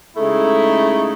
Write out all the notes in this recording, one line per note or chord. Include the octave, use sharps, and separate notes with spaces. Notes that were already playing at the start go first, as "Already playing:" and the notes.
C#3 G#3 A3 D#4 E4